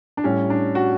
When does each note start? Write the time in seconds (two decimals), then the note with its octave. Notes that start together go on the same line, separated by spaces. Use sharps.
0.17 D4
0.24 A2 G3 C#4
0.50 D4
0.75 F#4